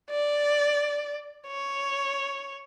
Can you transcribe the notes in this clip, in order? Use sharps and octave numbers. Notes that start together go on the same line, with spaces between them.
D5
C#5